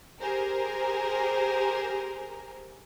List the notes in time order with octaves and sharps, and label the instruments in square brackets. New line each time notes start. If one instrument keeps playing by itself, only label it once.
[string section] G4 G#4 A#4 C5